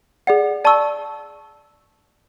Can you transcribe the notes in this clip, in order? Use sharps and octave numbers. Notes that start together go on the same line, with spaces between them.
G#4 D5 F#5
D5 A5 C#6 E6